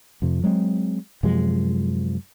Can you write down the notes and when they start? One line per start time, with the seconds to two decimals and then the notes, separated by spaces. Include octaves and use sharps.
0.22 F2 C3
0.44 F#3 G#3 B3 C4
1.23 F#2 C3 F3 G#3